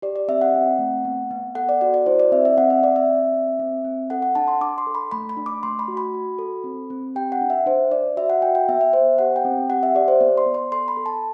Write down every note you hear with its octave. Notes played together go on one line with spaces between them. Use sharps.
G4 D5
D5
C4 E5
F#5
C4
A3
B3
B3
A4 F#5
D5
F#4 D5
D5
E4 C5
D5
C4 E5
E5
C4 F#5
E5
C4 D5
E5
C4
C4
C4
C4
A4 F#5
F#5
D4 A5
C6
D4 D6
C6
A4
B5
A3 B5
B5
D4
D6
A3 C6
B5
F#4
B5
F#4
A4
C4
C4
G4 G5
F#5
D4
E5
D4 C5
D4 D5
F#4 E5
F#5
F#4 G5
G5
B3 E5
E5
B3 C5
G4 F#5
G5
C4
G4 F#5
E5
G4 D5
C5
B3 D5
C6
B3
C6
A4 C6
B5
A4
A5